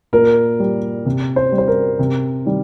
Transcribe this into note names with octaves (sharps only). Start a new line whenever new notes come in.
A#2 A#4
G3
C3
C5
G3
C5
A#4
C3
D#3 G3